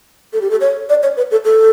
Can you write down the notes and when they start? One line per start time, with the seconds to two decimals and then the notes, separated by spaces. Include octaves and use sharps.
0.33 A4
0.41 G4
0.51 A4
0.61 C#5
0.89 D5
1.03 C#5
1.17 B4
1.31 A4
1.45 A4